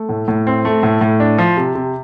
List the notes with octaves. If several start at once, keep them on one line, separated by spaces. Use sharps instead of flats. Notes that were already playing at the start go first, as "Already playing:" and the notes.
Already playing: A3
A2
A2
C4
A3
A2
A2
D4
F3
C3
C3